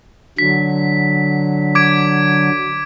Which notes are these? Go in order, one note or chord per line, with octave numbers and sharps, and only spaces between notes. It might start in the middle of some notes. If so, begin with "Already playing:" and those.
D3 F#3 B6
D6 G#6 D7